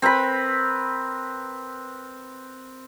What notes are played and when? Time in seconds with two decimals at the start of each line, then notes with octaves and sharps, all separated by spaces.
0.02 C4 A#4 B4 B5